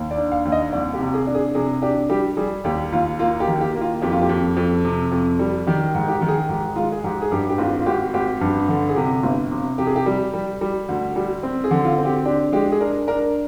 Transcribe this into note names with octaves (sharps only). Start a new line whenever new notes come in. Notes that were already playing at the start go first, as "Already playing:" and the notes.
Already playing: D#2
D5
D4
F5
D#2
D#5
C2 D5
G4
C3
G#4
D4
G#4
C3 G#4
D4 G4
G3 G4
G3 G#4
D#2 G4
D#2 F4
A#3 F4
G4
D#3
G4
A#3
F4
F2 G4
F4
G4
F2
F2
C3
F2
G3
D#3 G4
G#2
G4
D#3
G#4
G#2 G4
G#3 F4
G#4
G#2 G4
G#4
G2 G4
G4
G#1 F4
F4
G#1 G4
G#1 G4
G2
D3
G#4
C3 G4
G1
C3
C3 G4
G#4
G4
G3
G3
G3
D2
G3
C4
G#4
D3
F4
C4
G4
D4 G4
G#3 G4
G#4
D4 A#4
D4 A#4